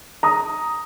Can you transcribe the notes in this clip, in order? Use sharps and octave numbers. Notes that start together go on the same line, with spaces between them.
A#5 D#6